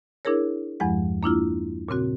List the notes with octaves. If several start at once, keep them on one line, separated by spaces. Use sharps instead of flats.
D4 E4 G#4 A#4 C#5
E2 G2 F3 G#3 F#5
A#3 D4 E4 F4
A#2 C#3 C4 F#4